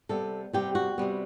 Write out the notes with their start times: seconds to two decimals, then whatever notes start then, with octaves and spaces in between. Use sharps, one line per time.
0.09 C3 G3 B3 A4
0.53 C3 G3 B3 G4
0.75 F#4
0.98 C3 G3 B3